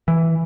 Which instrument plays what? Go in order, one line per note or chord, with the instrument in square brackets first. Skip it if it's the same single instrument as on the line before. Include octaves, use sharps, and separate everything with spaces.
[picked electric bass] E3